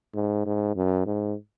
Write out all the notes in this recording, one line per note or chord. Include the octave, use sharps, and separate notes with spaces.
G#2
G#2
F#2
G#2